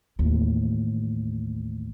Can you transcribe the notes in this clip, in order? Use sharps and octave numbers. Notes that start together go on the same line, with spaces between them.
A1 D#2